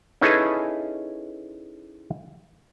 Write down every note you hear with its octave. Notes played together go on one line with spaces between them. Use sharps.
C#4 D#4 E4 G#4 A4 B4